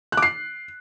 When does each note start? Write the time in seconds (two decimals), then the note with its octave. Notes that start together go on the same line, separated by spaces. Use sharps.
0.12 F#6
0.17 D6
0.22 C7